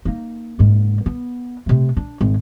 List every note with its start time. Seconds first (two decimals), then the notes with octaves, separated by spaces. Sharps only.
0.05 A#3 D#4
0.59 F#1 G#2
1.06 B3
1.66 C3 A3
1.97 D4
2.21 G#1